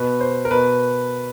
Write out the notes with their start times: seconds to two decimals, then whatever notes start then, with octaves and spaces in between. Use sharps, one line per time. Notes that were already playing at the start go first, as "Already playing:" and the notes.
Already playing: B2 B4
0.21 C5
0.45 A#4
0.51 B2 B4